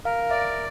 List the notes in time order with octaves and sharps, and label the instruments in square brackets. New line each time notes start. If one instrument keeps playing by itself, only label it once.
[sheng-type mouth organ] A#4 [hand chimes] F5
[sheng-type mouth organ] D5 [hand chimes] E5